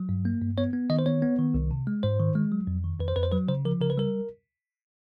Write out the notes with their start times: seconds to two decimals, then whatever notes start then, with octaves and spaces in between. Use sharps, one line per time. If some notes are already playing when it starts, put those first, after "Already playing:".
Already playing: F#3
0.09 G2
0.25 A#3
0.41 G2
0.58 B3 C#5
0.73 B3
0.90 D#3 D#5
0.99 C5
1.06 B3 C#5
1.22 B3
1.39 D#3
1.54 C2
1.71 C3
1.87 G#3
2.03 G#2 C5
2.20 D#3
2.35 G#3
2.52 F#3
2.67 F2
2.84 D#3
3.00 F2 B4
3.08 C5
3.16 F2 B4
3.23 C5
3.32 F#3 B4
3.48 C#3 C5
3.65 F3 A#4
3.81 C#3 A#4
3.90 B4
3.98 G3 A#4